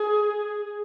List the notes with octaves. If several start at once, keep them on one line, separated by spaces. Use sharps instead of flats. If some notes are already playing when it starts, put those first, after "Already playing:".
Already playing: G#4